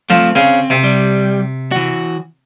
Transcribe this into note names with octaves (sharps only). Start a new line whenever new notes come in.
F3 A3 C4
C#3 C4
C3
G3
E3 F#4